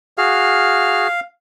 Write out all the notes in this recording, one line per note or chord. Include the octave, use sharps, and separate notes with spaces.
F#4 G#4 F5 F6